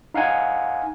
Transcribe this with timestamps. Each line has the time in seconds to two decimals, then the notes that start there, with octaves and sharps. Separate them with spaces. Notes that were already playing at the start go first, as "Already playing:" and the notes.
0.14 D#4 F5 F#5 G#5